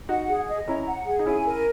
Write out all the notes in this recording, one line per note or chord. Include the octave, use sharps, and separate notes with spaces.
D#4 F#4 F#5
G#4
D#5
C#4 E4 A#5
F#5
G#4
D#4
C#4 E4 G#5
A#4